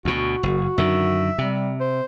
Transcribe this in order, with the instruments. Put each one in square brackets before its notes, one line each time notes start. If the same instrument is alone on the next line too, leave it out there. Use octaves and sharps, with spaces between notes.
[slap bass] D2 B2 [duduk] F#4
[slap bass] F#1
[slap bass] F#2 D3 D#3 [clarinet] E5
[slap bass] C3 [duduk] G3
[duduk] C5